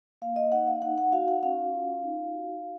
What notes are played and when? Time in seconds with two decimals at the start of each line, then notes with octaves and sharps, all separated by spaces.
0.22 A#3 F5
0.36 D#5
0.52 D#4 F#5
0.67 F5
0.82 D#4 F#5
0.98 F#5
1.12 F#4 F5
1.28 F#5
1.43 C#4 F5
1.74 F4
2.04 D#4
2.34 F#4